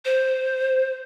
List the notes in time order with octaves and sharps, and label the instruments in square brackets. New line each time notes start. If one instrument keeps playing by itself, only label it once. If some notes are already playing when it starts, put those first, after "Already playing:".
[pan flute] C5